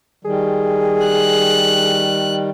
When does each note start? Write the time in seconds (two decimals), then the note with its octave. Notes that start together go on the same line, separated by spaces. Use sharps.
0.25 D#3 G3 G#4
1.07 F#6